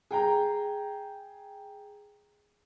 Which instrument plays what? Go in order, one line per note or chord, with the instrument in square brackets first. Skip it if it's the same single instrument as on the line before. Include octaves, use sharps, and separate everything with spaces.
[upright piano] G#4 G5 A#5